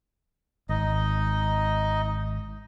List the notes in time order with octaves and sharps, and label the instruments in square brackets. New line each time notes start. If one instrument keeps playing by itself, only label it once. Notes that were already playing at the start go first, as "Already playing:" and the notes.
[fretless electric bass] G#1 [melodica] D#4 D#5